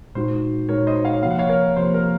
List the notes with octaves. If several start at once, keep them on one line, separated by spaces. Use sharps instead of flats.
A#2 G#3 D#4 F#4 C5
A#2 G#3 D#4 F#4 A#4 C#5
C5 D#5
C#5 F5
C3 F3 A#3 F5
F#5
C#5 F5
A#4 C#5
C3 F3 A#3 C5
A#4